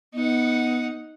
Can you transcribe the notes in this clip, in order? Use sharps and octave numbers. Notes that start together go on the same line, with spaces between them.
B3 D#4 F#5